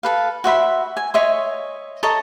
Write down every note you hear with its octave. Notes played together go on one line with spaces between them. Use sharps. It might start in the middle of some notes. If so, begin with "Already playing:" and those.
A4 B4 F5
F#4 C5 E5 B5
G#5
C#5 D#5 E5 C6
A4 C#5 D#5 A#5